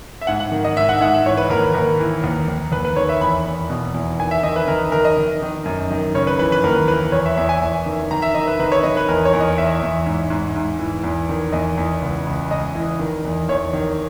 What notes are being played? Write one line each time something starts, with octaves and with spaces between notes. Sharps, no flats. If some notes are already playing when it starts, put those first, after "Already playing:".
E5
G#2 F#5
F#5
D#3
D#5
G#2 E5
F#5
G#2 F#5
E5
E3 C#5
B4
D#2 A#4
B4
D#2 A#4
E3
D#2
D#2
D#2 B4
B4
D#3 C#5
E5
E2 B5
E2
B2
E2
D#3 G#5
E5
D#3 D#5
B4
D#3 A#4
D#3 A#4
D#5
D#3
D#3
F#2
D#3
C#3 C#5
B4
E3 B4
B4
D#2 A#4
E3 B4
E2 C#5
E5
E2 E5
G#5
E2
D#3
D#3 A#5
E5
D#3 D#5
B4
D#3 B4
C#5
D#3 D#5
B4
E2 A#4
C#5
E2
D#5
E2 E5
E2
G#2
G#2
G#2
E3
E2
D#3
E2 D#5
E2
C#2
C#2
C#2 D#5
E3
D#3
E2
E2 C#5
D#3